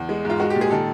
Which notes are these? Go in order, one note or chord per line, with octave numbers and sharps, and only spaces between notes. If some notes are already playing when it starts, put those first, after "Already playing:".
Already playing: E2
G#3
G#2 F4
G#3 F#4
A#2 G4
G#4
D#3 A4